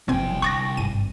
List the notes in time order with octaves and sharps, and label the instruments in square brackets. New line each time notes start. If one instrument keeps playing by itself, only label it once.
[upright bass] F#1 F3 [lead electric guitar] C2 G5 [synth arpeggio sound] B2 C4 G#5
[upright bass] D3 [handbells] C#6 A6 A#6 [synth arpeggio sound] D6 F#6
[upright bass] G#1 G2 [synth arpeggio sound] D#7